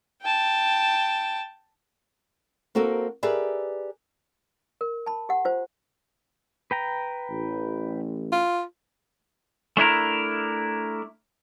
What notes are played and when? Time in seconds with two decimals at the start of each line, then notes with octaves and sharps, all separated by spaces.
0.22 G5 A5
2.75 A#3 C4 F#4 A4 A#4
3.23 G4 G#4 A#4 B4 D5 E5
4.81 A#4
5.06 A5 B5
5.29 G4 F#5
5.45 F4 C5
6.71 B4 G5 A#5
7.31 A1
8.32 F4
9.77 A3 D4 E4 A#4